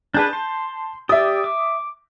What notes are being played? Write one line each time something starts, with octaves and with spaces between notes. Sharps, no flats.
D4 G#4 B4 A5 G6
C6
G4 D5 E5 D#6
D6